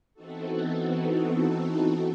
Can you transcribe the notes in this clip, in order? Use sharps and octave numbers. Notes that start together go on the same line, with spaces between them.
E3 B3 C4 D#4 F#4 A4